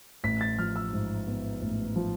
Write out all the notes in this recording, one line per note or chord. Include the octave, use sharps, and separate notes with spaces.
A1 B6
A6
F3 F6
E6
G#2
B3
A1
F3